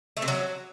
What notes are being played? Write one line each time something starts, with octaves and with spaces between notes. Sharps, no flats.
A3
C3
F#3